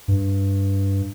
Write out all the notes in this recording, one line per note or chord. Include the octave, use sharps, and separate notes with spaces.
G2